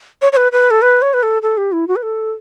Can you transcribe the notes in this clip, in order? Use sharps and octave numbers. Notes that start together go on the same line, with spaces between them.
C#5
C#5
B4
B4
A4
B4
C#5
B4
A4
A4
G4
E4
F#4
B4
A4